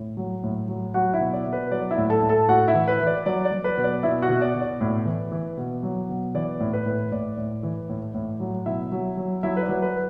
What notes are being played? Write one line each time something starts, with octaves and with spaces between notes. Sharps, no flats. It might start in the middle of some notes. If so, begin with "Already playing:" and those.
Already playing: A2
F#3
A2
F#3
F#3 F#4 F#5
E4 E5
B2
D5
B2
B4
F#3 D5
E4 E5
A2
A4 A5
A2
A4 A5
A2 F#4 F#5
E4 E5
E3
B4
E3
D5
F#3 D5
D5
F#3
B4
B2
D5
B2 E4 E5
F#4 F#5
B2
D5
B2
D5
A2
E3
E3
B2
F#3
B2
E3 D5
A2
B4
A2
A2 D5
A2
E3
A2
A2
F#3
B2 E4 E5
F#3
F#3
F#3 E4 E5
B4
D5
F#3
B4